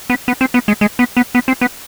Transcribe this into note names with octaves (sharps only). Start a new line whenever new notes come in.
B3
B3
C4
B3
G#3
G#3
B3
B3
B3
C4
B3